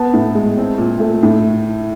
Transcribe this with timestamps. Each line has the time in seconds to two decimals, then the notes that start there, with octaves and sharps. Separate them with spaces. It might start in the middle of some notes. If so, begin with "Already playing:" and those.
Already playing: B3 A5
0.13 A2
0.35 G#3
0.57 C4
0.78 A#2
1.00 A3
1.23 A2